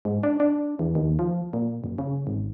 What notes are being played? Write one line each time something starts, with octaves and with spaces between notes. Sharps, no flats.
G#2
D4
D4
E2
D#2
F3
A#2
F#1
C#3
G#1